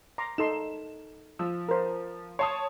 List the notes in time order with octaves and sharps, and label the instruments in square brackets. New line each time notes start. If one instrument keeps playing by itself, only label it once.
[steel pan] A#5 C6 D6
[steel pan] D#4 A4 C6 [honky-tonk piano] E7
[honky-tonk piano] F3 [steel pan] E6
[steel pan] A#4 C5
[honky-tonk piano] C#5 A5 D#6 [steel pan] C6